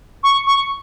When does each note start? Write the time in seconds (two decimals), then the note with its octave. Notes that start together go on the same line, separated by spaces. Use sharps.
0.23 C#6
0.46 C#6